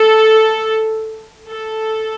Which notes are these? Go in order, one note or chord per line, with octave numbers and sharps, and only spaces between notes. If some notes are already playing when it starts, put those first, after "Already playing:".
Already playing: A4
A4